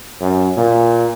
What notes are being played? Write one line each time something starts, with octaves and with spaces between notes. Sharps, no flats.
F#2
A#2